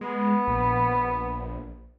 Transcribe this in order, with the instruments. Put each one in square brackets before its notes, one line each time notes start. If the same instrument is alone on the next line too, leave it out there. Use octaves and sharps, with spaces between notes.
[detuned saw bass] G#3 [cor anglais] B3
[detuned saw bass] A#1